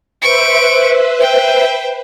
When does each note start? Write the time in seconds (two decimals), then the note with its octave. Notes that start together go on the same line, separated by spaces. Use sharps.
0.22 B4 C5 E5 C#6 D7
1.20 G5